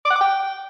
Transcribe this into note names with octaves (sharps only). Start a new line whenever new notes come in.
D6
F#5
D6
G5